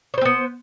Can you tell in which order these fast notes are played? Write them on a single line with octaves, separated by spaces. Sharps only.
C#5 C5 C4 B3